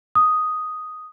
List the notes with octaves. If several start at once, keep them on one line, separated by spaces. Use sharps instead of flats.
D#6